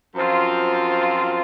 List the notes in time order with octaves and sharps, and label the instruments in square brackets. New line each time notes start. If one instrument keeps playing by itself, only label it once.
[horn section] F#2 F3 C4 F4